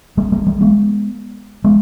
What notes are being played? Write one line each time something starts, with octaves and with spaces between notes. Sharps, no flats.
G3 A#3
G3 A#3
G3 A#3
G#3 B3
G#3 B3